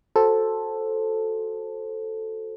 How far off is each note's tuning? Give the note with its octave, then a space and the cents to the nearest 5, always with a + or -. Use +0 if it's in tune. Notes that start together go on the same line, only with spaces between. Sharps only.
F#4 -10 A4 +0 C5 +10